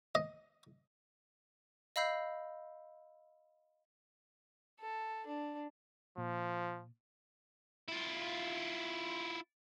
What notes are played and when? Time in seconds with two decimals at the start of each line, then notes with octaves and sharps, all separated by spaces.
0.15 D#5
1.96 D#5 F5 B5 E6 G6 C7
4.80 A4
5.26 D4
6.17 A#2 F3
7.88 E4 F4